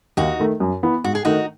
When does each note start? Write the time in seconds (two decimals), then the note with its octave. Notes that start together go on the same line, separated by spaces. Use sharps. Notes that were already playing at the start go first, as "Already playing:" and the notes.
0.17 D#2 D#4 F#4
0.39 D#3 A3
0.60 F#2
0.83 E3 B3
1.04 G#2 F#4
1.15 G#4
1.25 D#3 A3 D#4 F#4